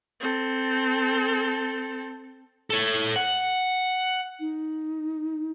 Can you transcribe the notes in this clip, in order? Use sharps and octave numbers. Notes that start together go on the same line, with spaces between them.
C4 A4
A4 C#5
F#5
D#4